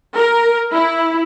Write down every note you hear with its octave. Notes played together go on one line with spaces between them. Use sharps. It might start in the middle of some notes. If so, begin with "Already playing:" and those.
A#4
E4